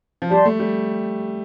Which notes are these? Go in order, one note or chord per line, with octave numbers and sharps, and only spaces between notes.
F3
G3 G4 D5 A5 C6
A3
G3